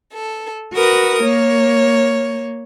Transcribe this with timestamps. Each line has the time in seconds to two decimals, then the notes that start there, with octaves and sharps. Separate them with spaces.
0.12 A4
0.73 F#4 A#4 B4 D#6
1.22 A#3 C#5